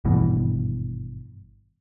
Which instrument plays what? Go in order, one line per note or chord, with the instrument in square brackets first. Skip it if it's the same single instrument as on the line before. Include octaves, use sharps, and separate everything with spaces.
[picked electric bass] G#1 G2 B2 E3